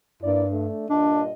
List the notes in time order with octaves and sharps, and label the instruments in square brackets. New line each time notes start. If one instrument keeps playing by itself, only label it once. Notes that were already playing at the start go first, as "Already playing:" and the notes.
[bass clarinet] G2 [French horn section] A#3 E4 D5
[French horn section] A3 D4
[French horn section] G2 A#2 D#5 [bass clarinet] D4